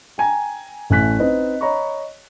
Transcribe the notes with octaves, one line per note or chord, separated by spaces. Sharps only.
G5 G#5 A#5
A1 A3 G#5 F#6 B6
C4 D#4 B4 D#5
C#5 D#5 A#5 B5 C#6